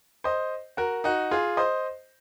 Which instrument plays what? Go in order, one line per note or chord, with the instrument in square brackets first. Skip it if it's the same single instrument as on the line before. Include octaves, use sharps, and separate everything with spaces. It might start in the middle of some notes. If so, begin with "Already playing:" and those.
[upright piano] C5 D#5
F#4 A#4
D#4 F#4
F4 G#4
C5 D#5